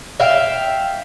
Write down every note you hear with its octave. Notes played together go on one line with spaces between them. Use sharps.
E5 F5 G5